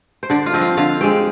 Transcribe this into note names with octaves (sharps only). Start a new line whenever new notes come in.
C5
D3 D4 D5
F4 F5
F3 C4 D#5
F4 F5
D3 F4 F5
G#3 C4 G4 G5